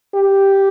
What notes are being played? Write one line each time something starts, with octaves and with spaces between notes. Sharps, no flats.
G4